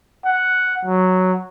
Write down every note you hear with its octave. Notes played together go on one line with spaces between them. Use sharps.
F#5
F#3